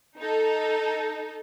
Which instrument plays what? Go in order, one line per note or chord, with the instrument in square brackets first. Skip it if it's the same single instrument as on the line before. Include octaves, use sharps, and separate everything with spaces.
[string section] D#4 A4